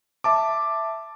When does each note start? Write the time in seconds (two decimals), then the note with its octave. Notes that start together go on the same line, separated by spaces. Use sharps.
0.24 E5 A5 D6